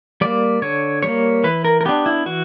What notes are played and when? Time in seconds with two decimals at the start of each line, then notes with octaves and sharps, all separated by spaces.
0.21 G3 A#3 D5
0.62 D3 C#5
1.03 G3 A#3 C#5
1.44 E3 B4
1.65 A#4
1.81 A#4
1.85 B3 D4 G4
2.06 E4
2.26 E3 F#4